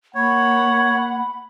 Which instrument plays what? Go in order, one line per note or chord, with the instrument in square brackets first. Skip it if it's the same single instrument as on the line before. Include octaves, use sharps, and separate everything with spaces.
[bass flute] A#3 [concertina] C#5 [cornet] F#5 [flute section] B5